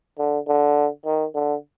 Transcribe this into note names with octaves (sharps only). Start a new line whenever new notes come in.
D3
D3
D#3
D3